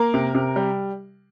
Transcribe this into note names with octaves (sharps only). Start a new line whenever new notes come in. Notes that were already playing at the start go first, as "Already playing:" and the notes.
Already playing: A#3 A#4
C3
C3
G3